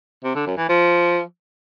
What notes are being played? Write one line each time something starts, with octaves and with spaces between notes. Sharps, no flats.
C3
D3
F#2
E3
F3